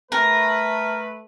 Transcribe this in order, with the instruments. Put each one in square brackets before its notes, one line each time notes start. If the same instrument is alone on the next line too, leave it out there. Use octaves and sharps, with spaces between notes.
[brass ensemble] A3 B4 [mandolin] A#4